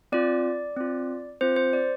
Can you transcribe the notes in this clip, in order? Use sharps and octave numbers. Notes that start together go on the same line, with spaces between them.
C4 F4 D5
C4 F4
C4 F4 C5
C5
D5